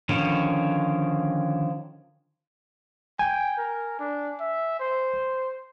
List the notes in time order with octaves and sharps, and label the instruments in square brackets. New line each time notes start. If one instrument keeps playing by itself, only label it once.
[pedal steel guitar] D3 D#3 F3 C#4
[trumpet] G5 [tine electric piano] G#5
[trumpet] A#4
D4
E5
C5